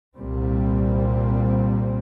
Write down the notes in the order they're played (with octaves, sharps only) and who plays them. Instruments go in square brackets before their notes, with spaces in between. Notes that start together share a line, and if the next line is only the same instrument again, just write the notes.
[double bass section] C2 A#2 G3 C4